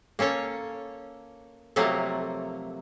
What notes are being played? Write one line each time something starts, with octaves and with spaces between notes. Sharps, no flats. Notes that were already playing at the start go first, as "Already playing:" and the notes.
A#3 C#4 A4 C#5
C3 F3 F#3 A3 A#3